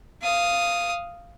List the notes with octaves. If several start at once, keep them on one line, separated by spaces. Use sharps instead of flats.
F5 D#6